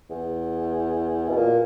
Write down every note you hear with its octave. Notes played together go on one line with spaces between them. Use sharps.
E2
B2
A#2